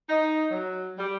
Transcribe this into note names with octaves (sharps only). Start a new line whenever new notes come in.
D#4
F#3
G3